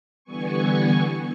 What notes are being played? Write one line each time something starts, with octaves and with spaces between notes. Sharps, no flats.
D3 E3 G3 B3 G#5 C#6